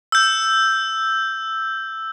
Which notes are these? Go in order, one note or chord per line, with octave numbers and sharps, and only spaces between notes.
E6 G6